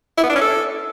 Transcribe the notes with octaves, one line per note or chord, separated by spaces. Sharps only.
E4
B3
D4
C#4
A4